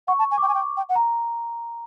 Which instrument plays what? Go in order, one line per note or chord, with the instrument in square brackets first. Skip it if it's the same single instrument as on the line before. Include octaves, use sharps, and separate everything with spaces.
[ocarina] F#5 [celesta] C#6
[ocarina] A5
G#5
[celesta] D6
[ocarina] G5 [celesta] C#6
[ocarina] G#5
G5
G5
F#5
[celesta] A#5